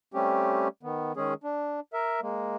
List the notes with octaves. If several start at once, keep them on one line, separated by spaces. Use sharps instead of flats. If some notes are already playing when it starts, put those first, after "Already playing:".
G3 A3 C4 C#4 G4
D#3 B3
D#3 G#3 C#4 G#4
D4
A#4 E5
G#3 A#3